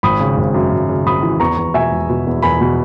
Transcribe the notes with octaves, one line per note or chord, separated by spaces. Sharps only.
G#1 B5 D#6
C#3
G#1
F#2
G#1
C#3
G#1 B5 D#6
E3
E2 A#5 C#6
E2
B2 E5 G#5
E1
B2
E2
E2 G#5 B5
B2